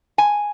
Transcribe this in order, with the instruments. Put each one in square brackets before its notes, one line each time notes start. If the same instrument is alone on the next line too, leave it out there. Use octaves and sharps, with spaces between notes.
[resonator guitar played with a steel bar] G#5